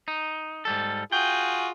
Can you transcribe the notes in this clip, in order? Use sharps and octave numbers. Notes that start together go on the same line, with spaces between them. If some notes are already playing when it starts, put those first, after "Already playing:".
D#4
G#2 G3 A4
F4 F#4 G#4 G5